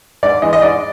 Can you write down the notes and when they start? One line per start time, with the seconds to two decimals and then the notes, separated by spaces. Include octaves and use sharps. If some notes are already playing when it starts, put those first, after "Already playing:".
0.23 G#2 D5
0.42 E3 G#3 D#5
0.53 D#5
0.62 G#2 D5